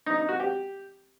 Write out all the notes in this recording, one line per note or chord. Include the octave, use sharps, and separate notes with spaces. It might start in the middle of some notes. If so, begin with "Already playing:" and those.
D#4
D#4
F#4
G4